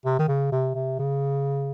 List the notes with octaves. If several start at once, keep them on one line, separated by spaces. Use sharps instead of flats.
C3
D#3
C#3
C3
C3
C#3